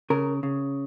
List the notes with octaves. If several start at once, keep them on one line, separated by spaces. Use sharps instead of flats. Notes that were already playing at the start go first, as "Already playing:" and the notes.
C#3 A#4
C#3